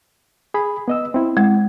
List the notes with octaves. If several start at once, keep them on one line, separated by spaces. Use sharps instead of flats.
G#4 B5
B3 D#5 E6
C4 E4
G#3